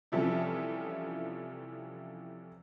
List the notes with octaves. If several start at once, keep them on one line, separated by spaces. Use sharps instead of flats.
C3 E3 F3 G3 C#4 A4